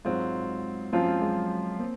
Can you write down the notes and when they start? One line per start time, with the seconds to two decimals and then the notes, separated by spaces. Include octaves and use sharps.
0.05 G#2 F#3 G#3 C4 F4
0.93 F#2 F3 A#3 C4 F4
1.01 F#3
1.07 G#3
1.21 G#3
1.79 A#3 C4